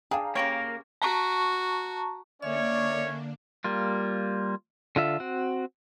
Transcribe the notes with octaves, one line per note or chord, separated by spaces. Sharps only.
D4 G#4 F5 G5 A#5
C#3 A#3 G4 A#4 C#5
F#4 A5 A#5 C#6
D3 A#3 C#4 D4 C#5 D5 E5
G3 A#3 F4
D3 F4 E5
C4 F#4